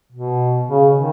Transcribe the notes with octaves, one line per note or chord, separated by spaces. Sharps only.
B2
C#3
D#3